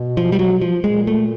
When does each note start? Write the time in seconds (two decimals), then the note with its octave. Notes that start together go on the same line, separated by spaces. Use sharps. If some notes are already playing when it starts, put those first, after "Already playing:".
Already playing: B2
0.17 F3
0.32 G3
0.39 F#3
0.62 F3
0.84 A#2 G#3
1.07 A3